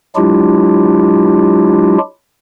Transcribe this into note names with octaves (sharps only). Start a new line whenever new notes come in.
F#3 G#3 D4 E4 F4 G4